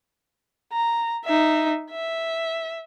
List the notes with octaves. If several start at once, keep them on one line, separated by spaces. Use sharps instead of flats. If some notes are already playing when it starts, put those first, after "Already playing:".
A#5
D#4 E5
E5